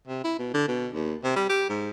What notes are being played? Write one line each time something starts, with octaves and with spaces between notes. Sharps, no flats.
C3
E4
B2
D3
B2
D#2
C3
G3
G4
G#2